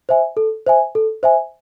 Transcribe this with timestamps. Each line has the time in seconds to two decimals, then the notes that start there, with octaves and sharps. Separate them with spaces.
0.09 C5 E5 G#5
0.37 A4
0.67 C5 E5 G#5
0.95 A4
1.23 C5 E5 G#5